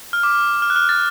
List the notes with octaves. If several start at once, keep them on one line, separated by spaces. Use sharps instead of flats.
F6
D6
F6
F#6
F6
A6